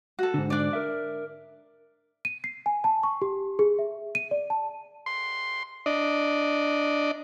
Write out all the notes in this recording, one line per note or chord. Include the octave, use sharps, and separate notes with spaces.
F#4 A4
G#2 D3
D4 D5
A#4 E5
D#7
C7
G#5
A5
C#6
G4
G#4
E5
D#7
D5
A5
C6
D4 D5 D#5